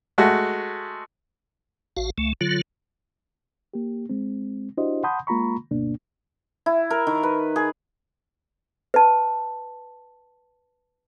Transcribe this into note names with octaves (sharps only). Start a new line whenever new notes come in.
G#3 A3 F#4
A1 F#4 F5
C#2 A3
D3 F#3 F4
A#3 G4
G#3 C4
D4 E4 F#4 G4 C5 D#5
F#5 A5 B5 C6 D#6 G6
G#3 A#3 F4 A#5 B5 C#6
D2 G2 B2 A#3 D4
E4
A#4
D#3
B4
G#4
B4 A5